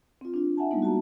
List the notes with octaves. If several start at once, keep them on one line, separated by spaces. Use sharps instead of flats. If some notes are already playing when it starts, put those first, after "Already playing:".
C4 F4
D4 F4
D#5 E5 F#5 G#5 A5
G3 G#3 A#3 B3 D#4
F#4 A5 A#5